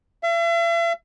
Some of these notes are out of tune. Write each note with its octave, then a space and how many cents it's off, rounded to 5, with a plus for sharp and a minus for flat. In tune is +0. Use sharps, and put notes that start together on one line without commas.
E5 +45